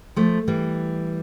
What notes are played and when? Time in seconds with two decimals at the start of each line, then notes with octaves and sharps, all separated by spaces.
0.16 F3 A3
0.48 E3 G3